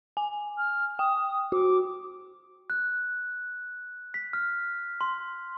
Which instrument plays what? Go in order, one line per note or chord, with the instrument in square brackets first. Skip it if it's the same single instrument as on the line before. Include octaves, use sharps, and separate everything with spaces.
[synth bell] G#5
[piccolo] F6
[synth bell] G5 [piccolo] D#6
[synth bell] F#4 [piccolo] D6
[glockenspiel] F#6
B6
F6
C6